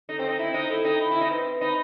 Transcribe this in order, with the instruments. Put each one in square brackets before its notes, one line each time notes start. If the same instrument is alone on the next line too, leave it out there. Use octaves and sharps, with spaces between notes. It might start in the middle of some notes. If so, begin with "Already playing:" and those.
[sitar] D#4 [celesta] A4
[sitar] C4
[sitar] D#4 [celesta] G5
[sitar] E4 [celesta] E5
[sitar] D#4 [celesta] C5
[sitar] E4 [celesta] A4
[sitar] D#4 [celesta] G5
[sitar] E4 [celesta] B5
[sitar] E4
[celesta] E5
[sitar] D#4
[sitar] C4 [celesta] B4
[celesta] B4
[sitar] D#4 [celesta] B5